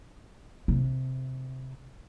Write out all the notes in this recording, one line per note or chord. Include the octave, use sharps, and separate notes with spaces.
C3